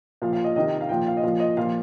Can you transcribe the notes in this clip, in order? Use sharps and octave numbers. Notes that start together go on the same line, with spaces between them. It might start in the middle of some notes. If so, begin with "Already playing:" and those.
A#2 F3 F5
F5
D#5
C3 D#3 D#5
F5
A#2 F3 G5
F5
D#5
A#2 F3 F5
D#5
A#2 F3 F5